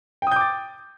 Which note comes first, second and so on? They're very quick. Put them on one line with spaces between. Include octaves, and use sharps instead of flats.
G5 D#6 G6 D6 A6